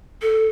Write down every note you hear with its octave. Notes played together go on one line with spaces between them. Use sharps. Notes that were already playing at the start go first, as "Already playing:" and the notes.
A4